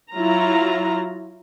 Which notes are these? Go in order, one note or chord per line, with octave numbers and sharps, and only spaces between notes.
F#3 E4 F4 A#5